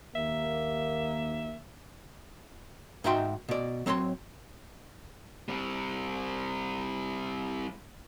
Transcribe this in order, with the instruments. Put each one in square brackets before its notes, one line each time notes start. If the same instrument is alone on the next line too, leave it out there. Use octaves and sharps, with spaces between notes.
[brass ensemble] D#2 A#3 [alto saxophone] E5
[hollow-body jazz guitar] G#2 D#4 F#4 E5 G5 C6
B2 D5
F#3 C4 C#5 A#5 C6
[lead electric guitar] G3 C4